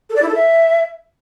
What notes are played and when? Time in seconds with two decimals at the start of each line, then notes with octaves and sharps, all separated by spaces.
0.09 A4
0.16 D5
0.22 E4
0.28 A4
0.35 E5